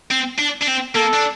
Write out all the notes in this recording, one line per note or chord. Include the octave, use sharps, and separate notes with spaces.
C4
D4
D4
C4
A#3 A4
D4